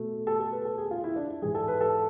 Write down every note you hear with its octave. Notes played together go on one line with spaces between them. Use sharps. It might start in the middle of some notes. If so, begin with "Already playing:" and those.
Already playing: B2 A3
A4
A4
B4
A4
G#4
F4
E4
D4
G#2 E3 G#3 G#4
A4
B4
A4